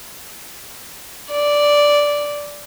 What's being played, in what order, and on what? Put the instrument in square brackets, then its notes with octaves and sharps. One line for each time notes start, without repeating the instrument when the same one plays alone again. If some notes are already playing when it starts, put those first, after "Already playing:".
[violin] D5